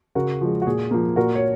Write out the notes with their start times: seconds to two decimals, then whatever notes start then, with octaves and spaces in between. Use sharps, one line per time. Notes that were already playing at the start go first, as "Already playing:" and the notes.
0.15 C#3 F#4 A#4
0.41 F3 G#3
0.62 F#4
0.67 A#2 G#4
0.91 F3 A#3
1.16 A#2 F#4 A#4
1.35 C#5